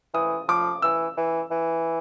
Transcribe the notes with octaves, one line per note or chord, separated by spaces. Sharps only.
E3 D#6
F3 D6
E3 E6
E3
E3